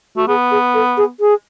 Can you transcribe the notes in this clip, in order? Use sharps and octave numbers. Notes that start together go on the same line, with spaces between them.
A3 F#4
B3 G#4
G#4
A4
G#4
G#4